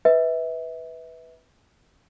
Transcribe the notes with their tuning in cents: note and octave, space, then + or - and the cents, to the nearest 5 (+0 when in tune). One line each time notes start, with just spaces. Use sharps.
B4 +0 E5 -30